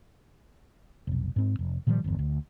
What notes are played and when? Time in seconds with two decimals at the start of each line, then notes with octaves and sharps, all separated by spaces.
1.07 F1 B1
1.36 G#2 C4
1.59 F1
1.87 A#2 D#3 F3 G3
2.04 G1 E2
2.19 D2